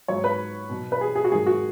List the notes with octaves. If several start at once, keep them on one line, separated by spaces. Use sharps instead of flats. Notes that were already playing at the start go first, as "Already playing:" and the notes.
G#2 F#3 C#5
B4
B2 F#3
B4
G#4
G#4
F#4
G#2 D#3 F#3 G#4
F#4